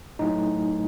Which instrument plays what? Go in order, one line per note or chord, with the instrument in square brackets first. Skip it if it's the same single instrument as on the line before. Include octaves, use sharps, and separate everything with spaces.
[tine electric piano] A2 F#3 A3 D#4